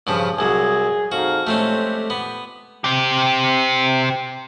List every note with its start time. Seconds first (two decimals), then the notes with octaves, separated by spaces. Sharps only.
0.07 G2 C#3 F3
0.39 C2 F#3 G#4
1.12 F2 D#4 F#4 F5
1.47 F2 G#3 A3 C4 C#4 G4
2.10 B3
2.84 C4 G4